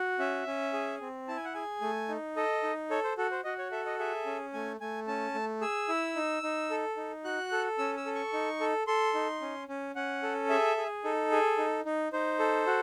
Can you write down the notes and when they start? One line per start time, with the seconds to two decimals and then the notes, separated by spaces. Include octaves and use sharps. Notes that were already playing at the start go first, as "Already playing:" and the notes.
Already playing: F#4
0.19 C#4 E5
0.47 C#4
0.73 G#4
1.01 C4
1.28 E4 A5
1.36 G#5
1.45 F#5
1.54 G#4 G#5
1.81 A3
2.09 D#4
2.36 A4 D#5
2.63 D#4
2.90 A4 C#5
3.04 C5
3.18 F#4 A4
3.31 C5
3.44 F#4 D#5
3.58 C#5
3.71 A4 E5
3.86 D#5
3.99 G#4 E5
4.26 C#4
4.53 A3 G#5
4.81 A3 G#5
5.07 C#4 A5
5.34 A3
5.61 G#4 E6
5.89 E4
6.16 D#4
6.43 D#4
6.70 A4
6.97 D#4
7.25 F#4 F#6
7.52 A4
7.78 C#4 E6
7.97 E6
8.06 A4
8.15 C#6
8.33 D#4
8.60 A4
8.87 A4 C6
9.14 D#4
9.41 C#4
9.68 C#4
9.95 C#4 F#5
10.23 A4
10.49 G#4 E5
10.77 G#4
11.04 D#4 A4
11.31 G#4
11.58 D#4
11.85 D#4
12.13 D#4 C5
12.39 A4
12.67 F#4